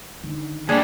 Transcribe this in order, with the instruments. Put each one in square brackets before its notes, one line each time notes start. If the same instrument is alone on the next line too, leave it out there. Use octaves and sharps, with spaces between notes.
[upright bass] D3 D#3
[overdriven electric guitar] D#2 G3 [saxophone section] D4 [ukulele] G#4